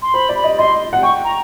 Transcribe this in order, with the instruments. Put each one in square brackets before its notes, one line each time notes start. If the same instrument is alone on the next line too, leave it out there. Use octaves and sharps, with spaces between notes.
[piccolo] C6
[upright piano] C5 [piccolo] B5
[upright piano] D5
[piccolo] B5
[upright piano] D#5
[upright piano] D#5 [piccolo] C6
[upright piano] F#5
[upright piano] G5 [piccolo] C#6
[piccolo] A#5